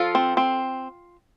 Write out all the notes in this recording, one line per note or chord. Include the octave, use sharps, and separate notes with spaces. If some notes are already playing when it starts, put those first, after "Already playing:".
Already playing: F3 F4 A4
C4
C4